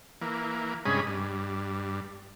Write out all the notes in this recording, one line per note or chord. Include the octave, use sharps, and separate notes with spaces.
E3 A#3
G2 C3 G#3 C#4 G#4 B5
G2